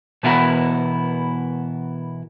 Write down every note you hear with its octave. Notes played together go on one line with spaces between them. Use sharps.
B2 E3 B3 E4 F#4 A#4